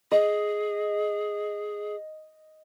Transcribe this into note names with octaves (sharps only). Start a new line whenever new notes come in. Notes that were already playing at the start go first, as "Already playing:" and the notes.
G#4 D#5